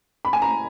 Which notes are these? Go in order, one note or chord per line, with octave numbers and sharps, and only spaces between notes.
B5
G#5
A#5